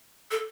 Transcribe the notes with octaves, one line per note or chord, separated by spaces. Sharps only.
A4